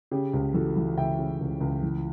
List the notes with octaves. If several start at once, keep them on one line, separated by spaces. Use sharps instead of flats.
C#3 G4
C#2
E3 F#4 A4
E3
C#2 E5 G5
C#3
C#2
C#2
E3